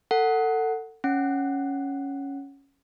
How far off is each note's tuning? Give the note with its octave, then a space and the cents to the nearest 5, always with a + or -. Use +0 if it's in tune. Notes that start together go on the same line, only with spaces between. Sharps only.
A4 +30 F#5 +0
C#4 +0 F#5 +0